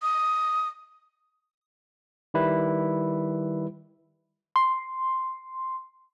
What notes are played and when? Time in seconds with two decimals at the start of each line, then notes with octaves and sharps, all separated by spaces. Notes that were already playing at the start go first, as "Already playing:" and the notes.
0.02 D#6
2.34 D#3 G3 E4 B4
4.56 C6